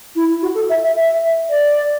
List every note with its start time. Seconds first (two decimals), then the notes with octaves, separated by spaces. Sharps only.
0.16 E4
0.42 F#4
0.55 A4
0.69 E5
0.83 E5
0.96 E5
1.50 D5